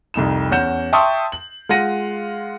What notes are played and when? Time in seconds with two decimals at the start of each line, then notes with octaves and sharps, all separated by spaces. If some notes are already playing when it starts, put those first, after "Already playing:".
0.14 C2 F2 D#4 E7
0.51 E2 C#4 F#5 G6 E7
0.93 E5 G5 A5 C6 C#6 D#6
1.32 F#7
1.69 G#3 F4 F5 F#5 A#6 D#7